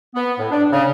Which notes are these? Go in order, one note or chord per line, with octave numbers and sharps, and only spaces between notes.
B3
A2
D4
C#3